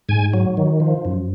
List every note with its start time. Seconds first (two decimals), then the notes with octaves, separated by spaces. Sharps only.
0.09 G#2 G#5
0.33 F#3
0.57 D#3
0.80 F3
1.05 F#2